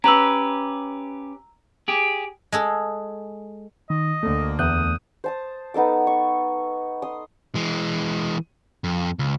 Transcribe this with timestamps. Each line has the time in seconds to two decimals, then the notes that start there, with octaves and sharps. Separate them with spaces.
0.04 C#4 G4 B4 A#5 E6
1.88 G4 G#4
2.52 G#3 G#4 A4
3.90 D#3 D#5
4.23 D2 D3 A3 A#3
4.59 E2 D#6 F#6 G6
5.24 C5 A5 D#6
5.74 B3 D#4 A4 D6
6.07 C#6
7.02 C6 D#6
7.55 E3 G#3
8.84 F2
9.19 C#2